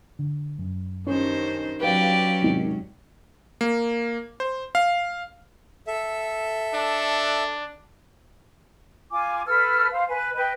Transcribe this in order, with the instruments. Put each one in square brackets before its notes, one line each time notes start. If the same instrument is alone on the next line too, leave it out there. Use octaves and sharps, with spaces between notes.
[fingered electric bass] D3
F#2
[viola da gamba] G2 D#3 C5 [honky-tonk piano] C#4
[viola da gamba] F#3 C#4 [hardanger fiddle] G4 D5 [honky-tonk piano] B4 F5
[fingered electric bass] E1 G#3 [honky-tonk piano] G#2 C3 D#3
[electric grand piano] A#3
C5
F5
[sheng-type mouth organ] A4 E5
[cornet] D4
[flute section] F4 G#5 D6
A4 B4 E6 F6
C5 F5
B4 G#5
B4 D#5 G5